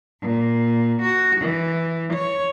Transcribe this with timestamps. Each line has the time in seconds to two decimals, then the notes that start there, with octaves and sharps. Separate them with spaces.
0.20 A#2
1.01 F#4
1.40 E3
2.12 C#5